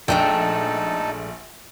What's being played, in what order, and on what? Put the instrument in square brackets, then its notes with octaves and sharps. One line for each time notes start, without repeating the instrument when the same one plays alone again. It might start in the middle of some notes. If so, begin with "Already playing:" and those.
[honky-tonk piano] A#1 [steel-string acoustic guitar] G#3 A3 D4 [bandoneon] D#4 A4 [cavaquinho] G5